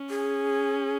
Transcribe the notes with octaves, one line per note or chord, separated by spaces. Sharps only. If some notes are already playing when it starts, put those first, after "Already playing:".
Already playing: C#4
G#4